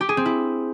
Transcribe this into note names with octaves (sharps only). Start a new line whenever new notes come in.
G4
G#4
C4
E4